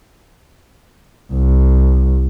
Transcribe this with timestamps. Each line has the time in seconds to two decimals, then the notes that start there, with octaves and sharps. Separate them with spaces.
1.33 C2